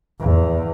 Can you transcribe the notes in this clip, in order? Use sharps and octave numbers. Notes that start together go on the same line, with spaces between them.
E2